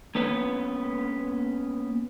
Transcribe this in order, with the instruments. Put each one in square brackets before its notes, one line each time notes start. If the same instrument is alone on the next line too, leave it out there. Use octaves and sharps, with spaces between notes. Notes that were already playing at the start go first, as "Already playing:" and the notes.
[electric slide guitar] A#3 B3 C#4 B4